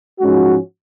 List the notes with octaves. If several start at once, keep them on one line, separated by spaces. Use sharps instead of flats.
G#2 F3 G#3 C#4 F#4